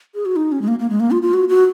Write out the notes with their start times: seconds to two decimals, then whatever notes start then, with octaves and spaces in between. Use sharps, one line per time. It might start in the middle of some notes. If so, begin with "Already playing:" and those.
0.15 G#4
0.25 F#4
0.36 D#4
0.52 C#4
0.62 G#3
0.68 A#3
0.79 A#3
0.90 G#3
1.00 A#3
1.11 F4
1.22 F4
1.34 F#4
1.49 F#4